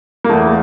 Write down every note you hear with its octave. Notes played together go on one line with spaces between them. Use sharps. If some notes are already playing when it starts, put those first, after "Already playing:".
A#3
E2 A3